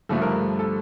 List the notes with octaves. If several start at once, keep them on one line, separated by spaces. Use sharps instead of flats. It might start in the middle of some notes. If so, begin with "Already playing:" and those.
G2 D3 F3 A3 A4
A#4
A4